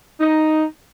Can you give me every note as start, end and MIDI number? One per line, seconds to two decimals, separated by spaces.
0.20 0.63 63